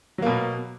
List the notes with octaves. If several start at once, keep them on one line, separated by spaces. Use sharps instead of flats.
B2 F#3 A#3